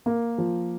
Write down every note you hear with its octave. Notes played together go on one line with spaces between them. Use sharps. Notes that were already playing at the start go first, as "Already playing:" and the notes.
A#3
F3